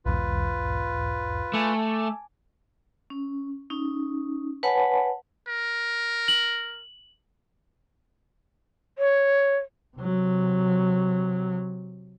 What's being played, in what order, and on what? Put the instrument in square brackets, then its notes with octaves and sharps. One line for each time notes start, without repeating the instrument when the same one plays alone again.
[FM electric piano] B1 E2 G#2 [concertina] F4 B4
[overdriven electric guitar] A3 [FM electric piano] G#5 A5 D6
[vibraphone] C#4
C#4 D#4
B4 C#5 F#5 G#5 A5 B5
[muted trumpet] A#4
[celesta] F#7
[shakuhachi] C#5
[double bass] C3 F#3